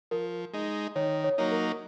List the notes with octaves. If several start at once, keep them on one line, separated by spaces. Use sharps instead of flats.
F3 A#4
G#3 D#4
D#3 C#5
C#5
F#3 A#3 D#4
A#4